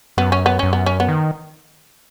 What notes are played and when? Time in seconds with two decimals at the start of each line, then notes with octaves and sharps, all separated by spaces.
0.17 F#2 B3
0.32 C#4
0.46 B3
0.59 F#2 C#4
0.73 B3
0.86 C#4
1.00 B3
1.09 D#3